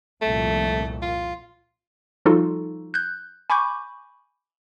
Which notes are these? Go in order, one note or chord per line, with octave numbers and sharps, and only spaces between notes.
C2 F2 A#2 A3
F4
F3 G3 D#4 F4 F#4 A4
F#6 G6
G#5 B5 C#6 D6 G6